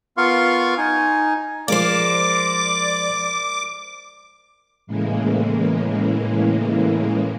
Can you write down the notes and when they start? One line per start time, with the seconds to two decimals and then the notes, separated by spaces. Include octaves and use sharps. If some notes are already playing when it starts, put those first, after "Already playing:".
0.17 B3 F4 A#4 F5 C6 C#6
0.77 D#4 G#5
1.68 F3 G#3 A#4 C5 D5 F5 D6
4.87 A2 C#3 E3 G#3 A#3